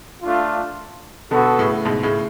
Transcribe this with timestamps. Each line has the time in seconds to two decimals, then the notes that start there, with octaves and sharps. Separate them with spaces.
0.23 A3 D4 F4
1.31 B2 D3 B3 F#4 A4
1.58 A2 C#3
1.85 G#2 B2
2.03 A2 C#3